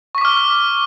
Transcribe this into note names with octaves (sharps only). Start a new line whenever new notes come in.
C#6 D6 F6 B6